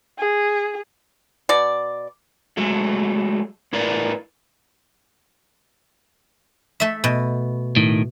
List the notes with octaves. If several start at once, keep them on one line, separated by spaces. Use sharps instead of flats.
G#4
B2 D5
F#3 G#3 A3
A2 E4 A#4 B4 D5
A3 E5
B2
A2 D#3